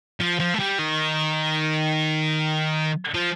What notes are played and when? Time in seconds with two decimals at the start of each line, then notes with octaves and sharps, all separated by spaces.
0.20 F3
0.40 F3
0.54 A3
0.59 G3
0.79 D#3
3.14 F3